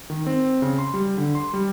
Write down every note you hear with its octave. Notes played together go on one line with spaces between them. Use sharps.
D#3
C4
C#3
C6
G3
D3
C6
G3